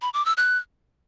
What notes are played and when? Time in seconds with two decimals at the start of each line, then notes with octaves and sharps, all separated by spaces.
0.02 B5
0.14 D6
0.25 E6
0.37 F#6